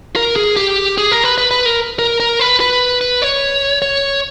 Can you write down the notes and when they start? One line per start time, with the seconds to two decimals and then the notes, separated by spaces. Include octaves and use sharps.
0.16 A#4
0.36 G#4
0.56 G4
0.98 G#4
1.11 A#4
1.24 B4
1.38 B4
1.51 B4
1.66 A#4
1.99 A#4
2.20 A#4
2.40 B4
2.60 B4
3.01 B4
3.22 C#5
3.82 C#5